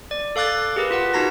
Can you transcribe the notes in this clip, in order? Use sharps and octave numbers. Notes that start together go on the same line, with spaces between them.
D5
A4 F5 D6 F#6 A6
G4 G#4 A#4 B4
F4 B4 F#5
D#4 F#4 A5 A#5 A#6